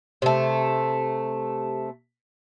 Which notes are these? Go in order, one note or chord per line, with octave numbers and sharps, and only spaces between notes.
C3 A3